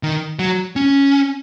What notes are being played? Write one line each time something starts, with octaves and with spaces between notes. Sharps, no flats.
D#3
F#3
C#4